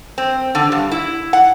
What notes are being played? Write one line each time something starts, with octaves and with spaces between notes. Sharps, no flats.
C4
D3
G2
E4
F#5